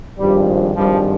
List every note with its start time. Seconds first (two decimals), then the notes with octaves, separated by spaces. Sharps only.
0.18 G#1 G2 F3 G3
0.74 G#1 G2 F3 G3